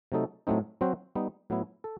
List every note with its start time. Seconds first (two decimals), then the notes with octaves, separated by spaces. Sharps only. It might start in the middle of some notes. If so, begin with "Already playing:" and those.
0.12 C3 F#3 A3 D#4 A4
0.47 A2 F#3 A3 C4 D#4
0.81 F#3 C4 F#4 C5
1.15 G3 B3 D#4
1.50 A2 F#3 B3 E4
1.84 A4